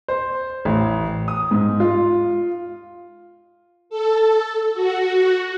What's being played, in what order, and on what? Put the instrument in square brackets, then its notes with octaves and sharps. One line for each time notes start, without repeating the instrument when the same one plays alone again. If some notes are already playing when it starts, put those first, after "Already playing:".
[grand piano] C5
A1
D#6
G#2
F4
[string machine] A4
F#4